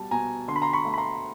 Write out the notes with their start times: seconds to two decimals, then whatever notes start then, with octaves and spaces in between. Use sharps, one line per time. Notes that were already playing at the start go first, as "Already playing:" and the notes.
Already playing: B2 G3 A5
0.11 B2 G#5 A#5
0.48 D3 C6
0.56 B5
0.62 A#5 C6
0.73 B5 C#6
0.85 A3
0.94 B5
0.98 A#5 C6